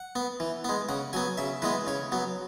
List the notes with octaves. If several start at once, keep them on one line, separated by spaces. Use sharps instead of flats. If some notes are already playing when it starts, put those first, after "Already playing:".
Already playing: F#5
B3
E3
G#3 B3
C#3 F#5
F#3 B3 G#5
C#3 E5
E3 G#3 B3 B4
C#3 C#5
F#3 B3